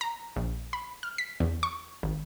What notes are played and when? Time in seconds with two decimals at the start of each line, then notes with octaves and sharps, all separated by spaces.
0.01 A#5
0.36 A#1
0.73 B5
1.03 F6
1.18 B6
1.40 E2
1.63 C#6
2.03 G#1